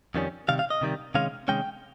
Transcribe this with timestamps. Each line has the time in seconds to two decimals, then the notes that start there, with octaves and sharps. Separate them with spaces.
0.15 F2 D#3 G3 C#4
0.48 C3 D#3 G3 F5
0.59 F5
0.70 D#5
0.81 C3 D#3 G3
1.15 C3 D#3 G#3 C#4 F5
1.48 C3 D#3 G#3 C#4 G5